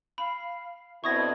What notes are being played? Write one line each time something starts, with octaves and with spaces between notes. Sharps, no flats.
F5 B5
B2 D3 C4 E4 C#6 D#6 G#6 A#6